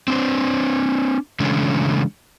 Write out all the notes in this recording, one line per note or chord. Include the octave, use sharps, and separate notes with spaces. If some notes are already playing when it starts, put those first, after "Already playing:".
C4 D4 C5
C#3 E3 G#3 A3 C#4 D4